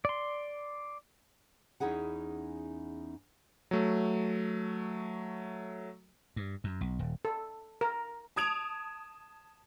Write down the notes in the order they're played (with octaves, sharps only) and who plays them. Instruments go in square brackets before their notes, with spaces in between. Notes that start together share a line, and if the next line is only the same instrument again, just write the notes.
[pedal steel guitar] D5 C6
[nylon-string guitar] E2 C#4 D#4 E4 G#4 F#5
[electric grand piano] F#3 A3
[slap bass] G2
F#2
B1
D#1
[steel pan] A4
A#4
[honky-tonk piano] A5 D#6 G#6 D7 F7